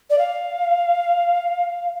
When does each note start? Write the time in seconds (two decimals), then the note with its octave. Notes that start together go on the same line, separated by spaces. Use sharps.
0.10 D5
0.18 F5